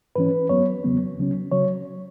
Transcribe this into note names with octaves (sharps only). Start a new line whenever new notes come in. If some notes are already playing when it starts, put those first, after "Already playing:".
G#2 E3 C#4 B4
F#2 F#3 B3 C#5
E2 C#3 F#3 B3
C#2 C#3 F#3 C#4
C#3 F#3 C#5